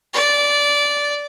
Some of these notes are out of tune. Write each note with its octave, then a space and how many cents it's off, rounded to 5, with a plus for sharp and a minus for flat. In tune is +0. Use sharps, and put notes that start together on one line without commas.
D5 -15